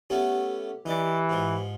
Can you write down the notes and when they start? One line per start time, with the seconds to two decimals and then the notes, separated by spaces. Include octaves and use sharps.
0.10 A3 B3 C#4 G4
0.86 E3 D#4 D5
1.29 G#2 F3